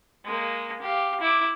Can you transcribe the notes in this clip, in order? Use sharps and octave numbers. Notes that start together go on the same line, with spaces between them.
G#3 A#3
G4 F5
E4 D6